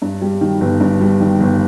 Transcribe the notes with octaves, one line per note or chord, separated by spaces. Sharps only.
G2
G3
D#3
G1
G2
G3
D#3
G1